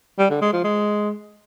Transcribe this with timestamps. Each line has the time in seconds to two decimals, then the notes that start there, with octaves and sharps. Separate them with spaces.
0.19 G3
0.30 D3
0.41 G#3
0.53 F3
0.64 G#3